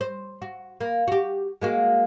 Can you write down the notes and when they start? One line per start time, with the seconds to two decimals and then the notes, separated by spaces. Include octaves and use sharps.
0.01 C5
0.42 F#4
0.81 A#3
1.08 F#4 G4
1.62 G#3 A#3 F#4